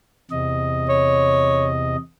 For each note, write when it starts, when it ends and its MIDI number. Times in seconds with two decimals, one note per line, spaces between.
0.31 1.96 40
0.31 1.96 48
0.31 1.96 75
0.89 1.68 73